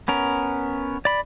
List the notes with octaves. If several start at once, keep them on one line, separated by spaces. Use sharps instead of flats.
B3 C#4 A#4
D5 B5